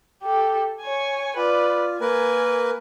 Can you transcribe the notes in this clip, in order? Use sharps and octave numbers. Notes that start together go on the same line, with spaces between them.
G4 A4
C#5 G#5
F4 B4 D5
A#3 A#4 B4 G#5